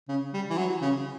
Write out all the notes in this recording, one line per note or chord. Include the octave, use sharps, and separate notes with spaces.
C#3
G3
E3
F#3
C#3